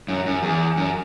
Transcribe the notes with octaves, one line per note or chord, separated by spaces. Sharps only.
F#2
F#2
E2
F#2